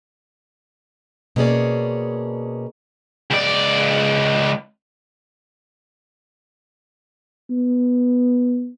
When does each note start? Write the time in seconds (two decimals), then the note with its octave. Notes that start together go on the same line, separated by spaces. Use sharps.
1.36 B2 A#3 C#4 G#4 D5
3.31 C#2 D5
7.51 B3